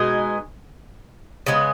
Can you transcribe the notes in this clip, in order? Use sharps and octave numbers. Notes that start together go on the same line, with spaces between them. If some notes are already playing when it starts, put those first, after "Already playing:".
Already playing: B2 G#3 D#4 G#4
C#3 G#3 B3